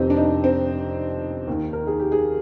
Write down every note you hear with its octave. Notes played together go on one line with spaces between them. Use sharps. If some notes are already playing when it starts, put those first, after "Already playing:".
Already playing: F1 F2 D#3 C4 D#4 G4
D4
D#4
C4
D#2 D#3
A#4
G#4
G4
G#4